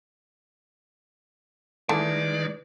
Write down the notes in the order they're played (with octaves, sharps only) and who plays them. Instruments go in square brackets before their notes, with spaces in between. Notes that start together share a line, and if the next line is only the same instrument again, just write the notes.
[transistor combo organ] D#3 G#3 [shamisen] E3 A3 [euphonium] B4 [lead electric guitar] D5